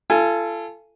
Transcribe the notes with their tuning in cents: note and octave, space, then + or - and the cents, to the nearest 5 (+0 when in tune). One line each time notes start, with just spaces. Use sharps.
F4 -35 A4 +0 G#5 +0